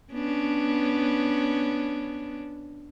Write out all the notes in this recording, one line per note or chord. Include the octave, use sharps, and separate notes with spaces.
B3 C#4 D4